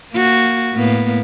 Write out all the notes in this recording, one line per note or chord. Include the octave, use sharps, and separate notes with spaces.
A#3 F#4
A2 A#3 B3